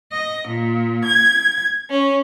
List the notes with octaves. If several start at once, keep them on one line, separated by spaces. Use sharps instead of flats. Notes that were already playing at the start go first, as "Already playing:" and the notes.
D#5
A#2
G#6
C#4